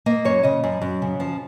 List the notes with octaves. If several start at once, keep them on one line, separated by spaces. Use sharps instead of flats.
A#3 D#5
F#2 C#5
C#3 D#5
F#2
F#2
C#3
F3